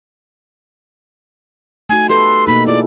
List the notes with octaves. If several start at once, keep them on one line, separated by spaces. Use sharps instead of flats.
A3 D#4 F#4 G#5
G4 A4 B4 C6
B2 A#3 D#4 B5
E4 F4 G#4 D5